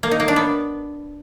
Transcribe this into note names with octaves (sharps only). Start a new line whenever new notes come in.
A#3
D#4
A#3
D4
B3